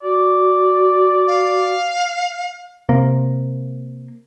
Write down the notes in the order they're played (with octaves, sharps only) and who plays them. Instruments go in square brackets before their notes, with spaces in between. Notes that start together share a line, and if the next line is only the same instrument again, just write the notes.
[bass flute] F#4 [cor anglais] D5
[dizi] F5
[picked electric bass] C3 A#3